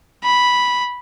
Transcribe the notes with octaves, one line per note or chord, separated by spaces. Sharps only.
B5